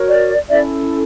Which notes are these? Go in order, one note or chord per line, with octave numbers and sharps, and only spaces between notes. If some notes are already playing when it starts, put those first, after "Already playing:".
Already playing: F#4 A#4 C#5
D5
C#4 E4 A4 D5 E5